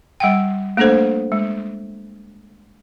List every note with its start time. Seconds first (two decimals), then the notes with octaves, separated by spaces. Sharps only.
0.20 G3 F#5 G5
0.77 A3 A#3 D4 A4 C5
1.32 G#3